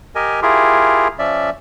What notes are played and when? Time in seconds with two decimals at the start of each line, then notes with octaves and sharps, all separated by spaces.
0.16 G4 A#4 D#5 G#5
0.42 E4 F4 G4 G#4 A#4
1.19 F3 C#4 D5 E5